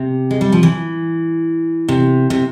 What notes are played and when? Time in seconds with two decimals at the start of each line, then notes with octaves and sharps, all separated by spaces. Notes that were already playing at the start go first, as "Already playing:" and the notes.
Already playing: C3
0.31 G#3
0.41 G3
0.52 F3
0.63 E3
1.89 C3
2.30 C3